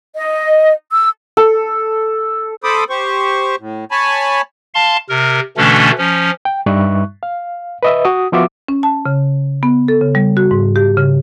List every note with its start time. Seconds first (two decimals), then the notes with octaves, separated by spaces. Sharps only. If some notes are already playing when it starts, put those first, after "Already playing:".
0.15 D#5
0.91 E6
1.37 A4
2.64 A4 C5 B5 D6 D#6
2.90 G4 C5 C#6
3.60 A2
3.91 C#5 G#5 A5 B5
4.74 F5 A5 C6
5.09 C3 A#4
5.57 B2 D3 E3 A3 C#4 D4
5.98 F3 C#4
6.45 G5
6.66 G2 G3 D#4 E5 C#6 F#6
7.23 F5
7.83 B4 D#5 E5
8.05 F#4 D#6
8.32 F3 B3 F4 F#4 E5 D6
8.68 C#4
8.83 A5
9.06 C#3
9.63 B3
9.88 A4
10.01 C#3
10.15 G3
10.37 F#4
10.51 G#2
10.76 G4
10.97 C#3